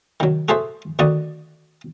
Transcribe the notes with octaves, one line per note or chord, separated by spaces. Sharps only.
D#3 F#3
F#4 G#4 A4 C5 E5
D2 D#3 F#4 D5 D#5